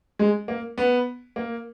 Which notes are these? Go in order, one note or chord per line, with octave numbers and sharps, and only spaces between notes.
G#3
A#3
B3
A#3